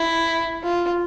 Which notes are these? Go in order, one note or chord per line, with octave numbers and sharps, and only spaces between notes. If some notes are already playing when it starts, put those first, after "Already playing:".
Already playing: E4
F4